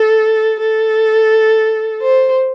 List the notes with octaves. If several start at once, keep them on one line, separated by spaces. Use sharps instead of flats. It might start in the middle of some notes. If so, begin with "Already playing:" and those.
Already playing: A4
A4
C5